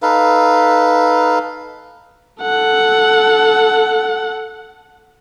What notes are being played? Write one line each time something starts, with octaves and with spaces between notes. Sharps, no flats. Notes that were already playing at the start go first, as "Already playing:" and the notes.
D#4 A4 B4 F5
A4 F#5